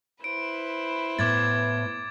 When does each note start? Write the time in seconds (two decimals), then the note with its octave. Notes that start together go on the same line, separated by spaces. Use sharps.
0.24 E4 B4 C5 D7
1.19 A2 B3 D6 G#6 A6